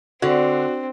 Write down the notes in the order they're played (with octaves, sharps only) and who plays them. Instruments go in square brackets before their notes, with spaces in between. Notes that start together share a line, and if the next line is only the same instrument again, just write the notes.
[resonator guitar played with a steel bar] D3 [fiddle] C4 [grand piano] F#4